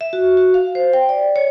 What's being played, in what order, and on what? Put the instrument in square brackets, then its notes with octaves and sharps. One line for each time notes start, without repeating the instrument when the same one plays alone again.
[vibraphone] E5
F#4
F#4
F5
C5
G5
D5
C#5